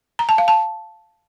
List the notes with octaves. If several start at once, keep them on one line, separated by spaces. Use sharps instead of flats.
A#5
A5
F5
A5